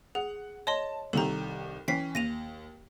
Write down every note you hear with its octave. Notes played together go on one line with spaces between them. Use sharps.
G#4 F#5
C#5 D#5 A5 C6
C2 D#3 G4 A4 A#5
E3 C#4 G5 B6 C7
D#2 A#6 D#7 F7